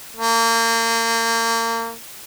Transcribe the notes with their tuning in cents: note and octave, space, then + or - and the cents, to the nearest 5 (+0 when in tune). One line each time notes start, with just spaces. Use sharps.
A#3 -30